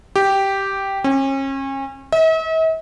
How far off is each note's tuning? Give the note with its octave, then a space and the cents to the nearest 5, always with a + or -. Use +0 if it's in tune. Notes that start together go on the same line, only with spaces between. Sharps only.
G4 -5
C#4 -35
E5 -45